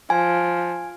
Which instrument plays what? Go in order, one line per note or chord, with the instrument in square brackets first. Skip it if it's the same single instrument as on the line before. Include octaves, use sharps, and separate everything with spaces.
[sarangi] F3 [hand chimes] G#5